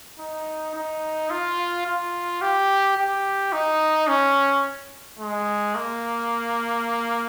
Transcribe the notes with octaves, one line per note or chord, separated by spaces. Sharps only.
D#4
D#4
F4
F4
G4
G4
D#4
C#4
G#3
A#3